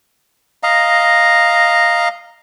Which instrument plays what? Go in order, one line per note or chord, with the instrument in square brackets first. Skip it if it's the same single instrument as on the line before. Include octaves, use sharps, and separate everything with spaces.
[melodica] D#5 F5 A#5